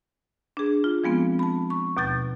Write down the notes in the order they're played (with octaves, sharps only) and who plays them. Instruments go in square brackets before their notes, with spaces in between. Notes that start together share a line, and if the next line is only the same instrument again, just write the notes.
[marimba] D4 G#4
F4
F3 G#3 B3 C4
A5 B5
C#6
D#2 B2 G6 A6